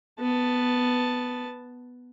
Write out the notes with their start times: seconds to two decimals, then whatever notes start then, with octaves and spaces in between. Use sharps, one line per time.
0.20 B3 A5